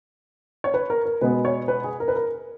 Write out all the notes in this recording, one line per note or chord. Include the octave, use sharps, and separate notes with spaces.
C#5
B4
A#4
A#4
B2 G#3 B3 B4
C#5
B4
G#4
A#4
B4
A#4